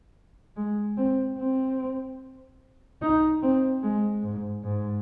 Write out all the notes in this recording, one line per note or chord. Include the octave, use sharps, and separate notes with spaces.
G#3
C4
C4
D#4
C4
G#3
G#2
G#2